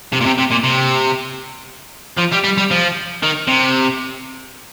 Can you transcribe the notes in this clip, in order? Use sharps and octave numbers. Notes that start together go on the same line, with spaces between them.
C3
A#2
C3
C3
A#2
C3
F3
G3
G3
G3
F3
D#3
C3